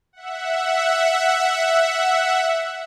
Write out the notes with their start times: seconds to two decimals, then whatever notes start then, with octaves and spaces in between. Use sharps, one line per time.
0.13 E5 F#5